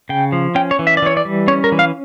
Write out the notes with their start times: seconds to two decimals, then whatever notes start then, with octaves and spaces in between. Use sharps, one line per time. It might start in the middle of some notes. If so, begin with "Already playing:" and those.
0.09 C#3 G5
0.32 F3
0.55 C#4 G5
0.71 C#5
0.79 E3
0.87 E5
0.97 D5
1.02 E3 C#5
1.17 D5
1.25 G3
1.48 C#4 C#5
1.64 A#4
1.72 E3
1.79 F5